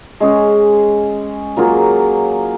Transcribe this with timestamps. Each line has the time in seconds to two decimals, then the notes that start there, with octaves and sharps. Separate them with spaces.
0.20 G#3 C#4 G#4
1.57 F#3 A#3 F4 G#4